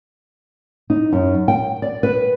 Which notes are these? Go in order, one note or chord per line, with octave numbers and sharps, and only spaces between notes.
D#4
F#2
G5
D5
B4